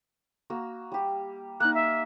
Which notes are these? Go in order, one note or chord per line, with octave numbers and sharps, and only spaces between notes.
A#3 F#4 E6
G3 G4
A#3 D#4 F#6
E5